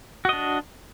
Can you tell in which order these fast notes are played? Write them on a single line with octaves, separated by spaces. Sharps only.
F#4 D#5 D4